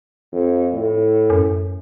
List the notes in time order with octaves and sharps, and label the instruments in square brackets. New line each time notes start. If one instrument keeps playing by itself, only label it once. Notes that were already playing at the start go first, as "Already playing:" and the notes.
[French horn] F2
A2
[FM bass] F#2